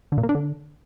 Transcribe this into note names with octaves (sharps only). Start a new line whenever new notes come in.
D3
A#2
A#3
D4
D3